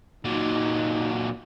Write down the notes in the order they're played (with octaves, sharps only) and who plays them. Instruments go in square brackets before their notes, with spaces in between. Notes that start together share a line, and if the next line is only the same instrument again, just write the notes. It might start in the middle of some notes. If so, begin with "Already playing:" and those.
[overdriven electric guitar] A#2 F#3 [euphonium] D#4